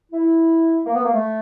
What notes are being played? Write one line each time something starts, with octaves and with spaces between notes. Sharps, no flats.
E4
A#3
B3
A#3
A3